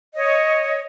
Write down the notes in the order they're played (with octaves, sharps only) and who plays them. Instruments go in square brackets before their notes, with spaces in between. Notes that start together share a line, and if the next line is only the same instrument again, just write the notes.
[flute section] C#5 D#5